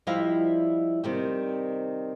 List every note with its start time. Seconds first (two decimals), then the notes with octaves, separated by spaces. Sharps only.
0.07 F3 G3 E4 D#5 F5
1.04 C3 D#3 G3